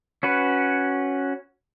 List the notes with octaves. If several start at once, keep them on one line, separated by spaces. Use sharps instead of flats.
C#4 F#4 B4